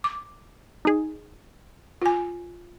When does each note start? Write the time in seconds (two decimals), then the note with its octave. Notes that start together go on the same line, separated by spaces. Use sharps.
0.04 D6
0.85 D#4 G#4
2.02 F4 G#5